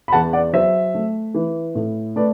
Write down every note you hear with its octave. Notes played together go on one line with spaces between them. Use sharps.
B5
E2 F#5 A5
D5 F#5
F#3 C5 E5
A3
E3
A2
A3 B4 D5